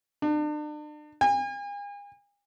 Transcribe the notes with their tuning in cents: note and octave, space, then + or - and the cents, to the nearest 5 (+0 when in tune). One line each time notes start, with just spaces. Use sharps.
D4 +40
G#5 -40